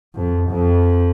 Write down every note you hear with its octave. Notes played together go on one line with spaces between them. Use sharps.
F2
F2